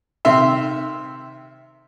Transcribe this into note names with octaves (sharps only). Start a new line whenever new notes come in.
C3 D#3 E5 C6